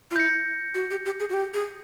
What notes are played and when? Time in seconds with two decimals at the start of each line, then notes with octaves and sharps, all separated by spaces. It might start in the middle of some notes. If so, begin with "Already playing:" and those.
0.11 F4
0.16 E4 G6 A#6 C#7
0.75 F#4
0.91 G4
1.05 G4
1.20 G#4
1.30 F#4
1.34 G4
1.54 G#4